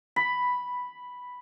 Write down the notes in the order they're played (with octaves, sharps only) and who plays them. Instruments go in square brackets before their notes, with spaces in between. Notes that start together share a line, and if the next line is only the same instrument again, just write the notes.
[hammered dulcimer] B5